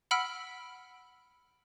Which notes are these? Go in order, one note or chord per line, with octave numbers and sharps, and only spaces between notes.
F#5 B5 E6 F6 B6 D7